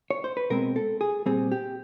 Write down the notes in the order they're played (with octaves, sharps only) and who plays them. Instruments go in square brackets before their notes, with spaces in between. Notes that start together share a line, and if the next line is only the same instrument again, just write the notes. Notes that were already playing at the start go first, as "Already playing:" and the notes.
[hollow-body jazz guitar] C#5
C5
B4
B2 G#3 C4 A#4
A4
G#4
A#2 G3 C4 G#4
G4